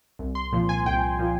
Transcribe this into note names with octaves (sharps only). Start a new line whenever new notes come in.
C2
C6
A#2 F3
G#5
C2 G5
A#2 F3